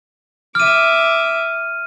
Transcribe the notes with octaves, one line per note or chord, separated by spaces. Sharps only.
E5 D6 F6 D#7